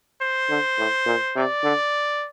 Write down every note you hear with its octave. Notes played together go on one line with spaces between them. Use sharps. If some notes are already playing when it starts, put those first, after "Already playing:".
C5
D3
A2
A#2
C3 D5
D3